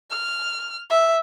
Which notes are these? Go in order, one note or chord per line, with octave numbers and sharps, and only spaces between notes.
F6
E5